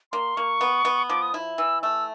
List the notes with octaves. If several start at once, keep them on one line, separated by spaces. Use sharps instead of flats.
A#3 C6
A#3 C#6
B3
B3
F3 D6
D#6
E4
E3 E6
A3 E6